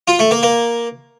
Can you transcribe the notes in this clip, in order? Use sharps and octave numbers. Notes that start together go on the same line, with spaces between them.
F4
A3
A#3
A#3